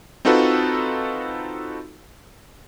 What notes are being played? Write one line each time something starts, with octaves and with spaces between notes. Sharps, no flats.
C4 D#4 F4 F#4 A4 B4